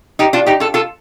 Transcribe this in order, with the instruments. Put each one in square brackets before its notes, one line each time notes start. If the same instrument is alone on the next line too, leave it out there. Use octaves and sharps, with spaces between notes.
[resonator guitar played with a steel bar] D#4 G4
D4 F4
D#4 G4
F4 A4
F4 A4